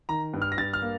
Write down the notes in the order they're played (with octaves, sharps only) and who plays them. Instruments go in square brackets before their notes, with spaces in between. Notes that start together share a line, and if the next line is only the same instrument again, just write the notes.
[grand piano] D#3 A#5
G2
F6
A#6
G2 A6
F6
A#3